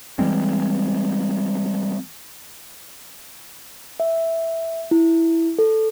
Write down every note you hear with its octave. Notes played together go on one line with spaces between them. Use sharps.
E3 G3 G#3 C4
E5
E4
A4